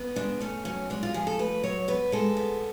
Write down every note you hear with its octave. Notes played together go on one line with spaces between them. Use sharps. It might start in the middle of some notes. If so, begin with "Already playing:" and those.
Already playing: B3
G#3 D4
A3 C#4
F#3 C#4
G#3 D4
F4
F3 G#4
A4
A3 B4
F#3 C#5
B3 B4
G#3 A4
B3